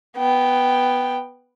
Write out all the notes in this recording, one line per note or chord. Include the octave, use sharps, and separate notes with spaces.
B3 G5